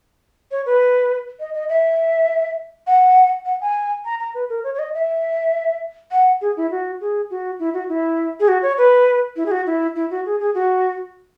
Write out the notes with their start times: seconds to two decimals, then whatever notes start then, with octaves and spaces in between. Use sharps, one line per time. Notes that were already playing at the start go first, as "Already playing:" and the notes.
0.51 C#5
0.66 B4
1.40 D#5
1.54 D#5
1.69 E5
2.87 F#5
3.46 F#5
3.61 G#5
4.05 A#5
4.20 A#5
4.35 B4
4.49 A#4
4.64 C#5
4.74 C#5
4.79 D#5
4.94 E5
6.11 F#5
6.41 G#4
6.57 E4
6.71 F#4
7.01 G#4
7.30 F#4
7.59 E4
7.74 F#4
7.89 E4
8.40 G#4
8.48 F#4
8.63 C#5
8.78 B4
9.36 E4
9.46 G#4
9.51 F#4
9.67 E4
9.96 E4
10.10 F#4
10.26 G#4
10.40 G#4
10.54 F#4